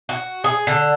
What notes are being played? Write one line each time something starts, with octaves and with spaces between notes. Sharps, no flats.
F#4
G#4
D3